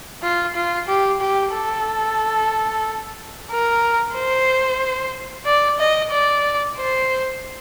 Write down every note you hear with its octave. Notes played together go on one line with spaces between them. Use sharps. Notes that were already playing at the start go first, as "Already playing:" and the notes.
F4
F4
G4
G4
A4
A#4
C5
D5
D#5
D5
C5